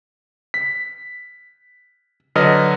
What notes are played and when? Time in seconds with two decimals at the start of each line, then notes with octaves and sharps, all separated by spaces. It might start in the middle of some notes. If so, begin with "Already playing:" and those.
0.54 B6
2.35 D3 F#3 B4 D#5 F6